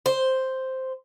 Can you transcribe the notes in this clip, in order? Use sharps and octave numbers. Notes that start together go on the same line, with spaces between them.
C5